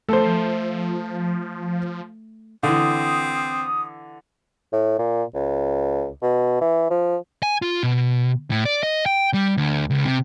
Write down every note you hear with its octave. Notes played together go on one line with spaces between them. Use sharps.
F3 A3 A4 C5
D3 E3 C4 D#6
A2
A#2
C#2
B2
E3
F3
G#5
F4
B2
A2
D5
D#5
G5
G3
D2
C#2
C3